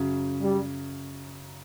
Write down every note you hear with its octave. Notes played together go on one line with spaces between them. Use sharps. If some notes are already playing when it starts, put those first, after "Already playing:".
Already playing: F#2 C#3 F#3
G3